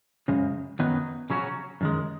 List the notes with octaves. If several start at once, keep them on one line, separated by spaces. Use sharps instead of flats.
F#2 C#3 G#3
F#2 D#3 F#3 B3 D#4
C#3 F#3 C#4 F#4
F#2 D#3 G#3